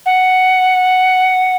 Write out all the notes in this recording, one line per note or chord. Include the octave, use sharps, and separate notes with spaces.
F#5